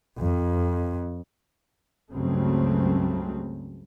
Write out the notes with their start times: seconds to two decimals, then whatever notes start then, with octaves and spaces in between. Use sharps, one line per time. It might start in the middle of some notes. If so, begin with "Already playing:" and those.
0.20 F2
2.12 C#2 G2 C#3 F#3 A3 C4